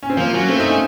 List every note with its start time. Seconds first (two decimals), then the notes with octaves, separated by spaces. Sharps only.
0.03 C#4
0.10 C4
0.17 F3 A#3
0.33 F#3 C#4
0.48 A3 C4
0.60 D#4
0.70 C#4